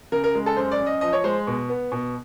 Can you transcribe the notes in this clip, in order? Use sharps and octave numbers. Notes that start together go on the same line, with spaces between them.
C#3 A#4
A#4
G#3
A4
F#2 C5
D5
F#2
D#5
F3 D#5
C#5
G#3 C5
B2
B3
B2